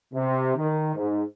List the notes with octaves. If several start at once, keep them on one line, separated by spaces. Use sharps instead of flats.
C3
D#3
G#2